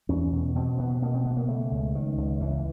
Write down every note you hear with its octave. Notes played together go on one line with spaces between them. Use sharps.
E2 C#4
B2
B2 C4
B2 B3
B2 A#3
C4
B2 B3
A#3
C#3 A3
C#2
C#2 D#3
C#2
C#2 E3